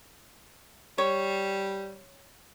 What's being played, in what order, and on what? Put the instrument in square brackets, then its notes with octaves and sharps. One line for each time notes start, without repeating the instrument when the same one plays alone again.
[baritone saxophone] G3 [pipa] C#5